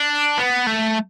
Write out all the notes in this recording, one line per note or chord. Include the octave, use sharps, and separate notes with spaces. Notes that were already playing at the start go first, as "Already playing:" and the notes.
Already playing: D4
B3
A3